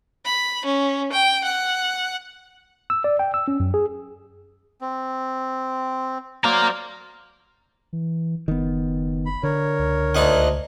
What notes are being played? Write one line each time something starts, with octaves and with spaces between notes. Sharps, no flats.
B5
C#4
G5
F#5
E6
D5
G5
E6
C#4
F#2
G#4
C4
F#3 A#4 C5 D5 F5
E3
F#1 D#3 B3
B5
D3 A#4 C#5
C#2
D2 D#4 F#5